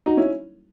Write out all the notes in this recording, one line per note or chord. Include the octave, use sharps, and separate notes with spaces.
D#4 F#4
C#4 E4